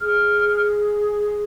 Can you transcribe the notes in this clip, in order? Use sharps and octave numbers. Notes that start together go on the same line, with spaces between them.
G#4 F6